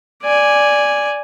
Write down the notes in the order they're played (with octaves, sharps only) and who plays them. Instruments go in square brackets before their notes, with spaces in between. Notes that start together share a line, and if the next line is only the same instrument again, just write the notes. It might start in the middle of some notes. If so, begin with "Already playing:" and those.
[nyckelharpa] D5 G#5